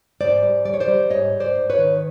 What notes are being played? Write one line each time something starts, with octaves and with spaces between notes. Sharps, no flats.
G#2 C5 D5
G3
G3 D5
C#5
C5 D5
G3
G#2 C#5 D#5
G#2
C5 D5
G#2
B4 C#5
D#3